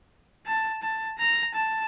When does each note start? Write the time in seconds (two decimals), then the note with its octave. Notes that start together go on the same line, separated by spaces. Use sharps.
0.46 A5
0.82 A5
1.18 A#5
1.55 A5